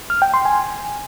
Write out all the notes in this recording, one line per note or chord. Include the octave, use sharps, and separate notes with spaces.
F6
G5
C6
G#5